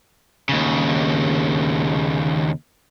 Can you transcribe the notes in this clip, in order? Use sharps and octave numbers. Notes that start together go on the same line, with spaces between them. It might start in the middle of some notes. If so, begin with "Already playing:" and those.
D#2 C#3